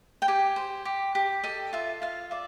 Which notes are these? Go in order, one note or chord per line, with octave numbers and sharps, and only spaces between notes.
G5
G4 G#5
C5
G4
G4
A4 D#5
F4 E5
F4 F5
D5 E5